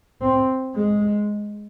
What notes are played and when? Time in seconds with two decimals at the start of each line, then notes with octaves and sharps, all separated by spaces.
0.21 C4
0.75 G#3